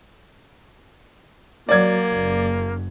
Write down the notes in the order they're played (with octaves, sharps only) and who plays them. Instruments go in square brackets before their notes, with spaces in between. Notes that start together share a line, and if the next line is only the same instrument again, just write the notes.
[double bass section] F#3 [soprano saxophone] A#3 [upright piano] D5 G#6
[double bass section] F#1